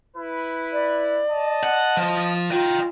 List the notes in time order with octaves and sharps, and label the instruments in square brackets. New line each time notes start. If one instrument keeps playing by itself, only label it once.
[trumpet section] E4 B4
[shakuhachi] D5
[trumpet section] D#5 A5
[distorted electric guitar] F#5
F3
[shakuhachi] F4 [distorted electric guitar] D#5 G5